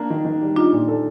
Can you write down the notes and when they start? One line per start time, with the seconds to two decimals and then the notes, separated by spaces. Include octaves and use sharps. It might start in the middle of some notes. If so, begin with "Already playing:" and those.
Already playing: A#3 D4
0.10 D#3
0.25 D#3
0.42 G3
0.56 D4 D#4 F4
0.73 A#2
0.88 A4